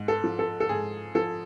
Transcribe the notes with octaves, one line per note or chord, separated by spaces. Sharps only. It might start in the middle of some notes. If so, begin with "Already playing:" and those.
Already playing: G#2
A4
F3
A4
A4
G#2 G#4
F3 A4